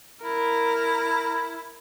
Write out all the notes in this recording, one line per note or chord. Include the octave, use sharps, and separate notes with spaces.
E4 A#4